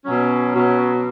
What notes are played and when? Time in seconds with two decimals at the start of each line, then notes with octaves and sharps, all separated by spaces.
0.05 B2 F#3 C#4
0.55 B2 F#3